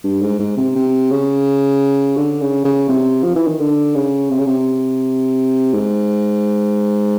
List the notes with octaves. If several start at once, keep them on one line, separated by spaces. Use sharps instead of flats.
G2
G#2
G#2
C3
C3
C#3
D3
C#3
C#3
C3
F3
E3
D#3
D3
C#3
C3
C#3
C3
G#2